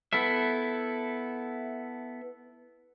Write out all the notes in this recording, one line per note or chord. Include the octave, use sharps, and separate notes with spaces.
B3 E4 A4 E5